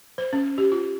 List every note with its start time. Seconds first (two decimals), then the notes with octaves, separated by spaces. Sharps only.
0.18 C5
0.33 C#4
0.58 G4
0.72 F4